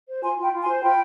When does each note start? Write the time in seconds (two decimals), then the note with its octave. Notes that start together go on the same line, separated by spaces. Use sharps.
0.08 C5
0.23 F4 G#5 C6
0.37 F4
0.43 G5 B5
0.53 F4
0.62 G#5 C6
0.68 C5
0.82 F4 G5 B5